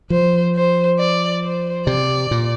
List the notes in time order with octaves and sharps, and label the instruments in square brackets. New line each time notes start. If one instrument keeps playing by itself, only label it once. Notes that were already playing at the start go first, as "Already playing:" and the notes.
[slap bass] F3 [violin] C5
[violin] C5
D5
C5
[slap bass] C3 [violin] D5
[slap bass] A#2